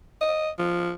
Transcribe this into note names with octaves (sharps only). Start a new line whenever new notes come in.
D#5
F3